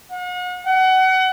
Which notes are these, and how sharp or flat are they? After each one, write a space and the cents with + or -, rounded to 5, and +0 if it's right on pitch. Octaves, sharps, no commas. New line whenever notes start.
F#5 -40
F#5 +25